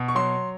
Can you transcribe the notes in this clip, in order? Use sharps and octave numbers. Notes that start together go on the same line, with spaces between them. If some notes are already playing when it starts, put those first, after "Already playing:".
Already playing: B2
C#6
F#3 C6